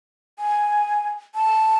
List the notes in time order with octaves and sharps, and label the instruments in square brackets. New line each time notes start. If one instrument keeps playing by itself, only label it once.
[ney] G#5
A5